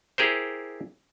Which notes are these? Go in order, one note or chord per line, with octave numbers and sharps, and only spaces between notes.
E4 G4 G#4 A#4 C5